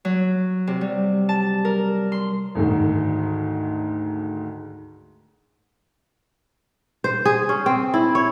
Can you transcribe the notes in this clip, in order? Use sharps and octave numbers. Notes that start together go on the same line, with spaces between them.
F#3
C3
G3
A5
A#4
C6
D2 G#2 D#3
C5
G#4
C#4
C4
E4
C#5